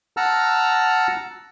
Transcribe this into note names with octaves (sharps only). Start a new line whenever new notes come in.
F#5 A5 A#5 E6 F6